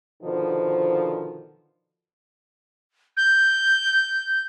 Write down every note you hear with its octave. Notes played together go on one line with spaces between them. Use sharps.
B2 D3 D#3 F3
G6